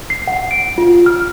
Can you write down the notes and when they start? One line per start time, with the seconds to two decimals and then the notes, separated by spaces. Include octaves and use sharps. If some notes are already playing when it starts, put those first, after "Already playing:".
0.10 C7
0.27 F#5
0.51 D7
0.78 F4
1.06 F6